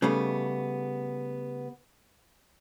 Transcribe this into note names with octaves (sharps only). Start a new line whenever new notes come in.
C#3 G3 A3 B3